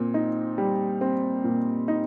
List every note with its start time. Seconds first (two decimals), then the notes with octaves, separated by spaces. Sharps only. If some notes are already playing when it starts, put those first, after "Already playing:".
Already playing: A#2 C4
0.14 D#4
0.58 G3
1.01 C4
1.44 A#2
1.88 D#4